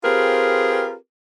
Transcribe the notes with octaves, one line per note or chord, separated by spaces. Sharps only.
C4 F4 G4 G#4 A#4 B4